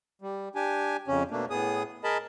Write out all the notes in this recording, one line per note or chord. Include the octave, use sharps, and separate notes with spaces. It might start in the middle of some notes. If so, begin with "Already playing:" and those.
G3
D4 G4 G#5
F2 C#3 C#4
B2 A3 A#3 D4
A2 B3 G#4 D#6
G#4 A#4 D#5 A5 B5